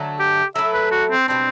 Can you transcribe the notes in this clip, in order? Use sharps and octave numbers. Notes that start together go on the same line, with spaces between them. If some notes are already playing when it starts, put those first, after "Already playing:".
Already playing: D3 F#3 A3
G4
F#3 A3 E4 A4 E5
B4
F#4
C4
B2 G3 C4 D4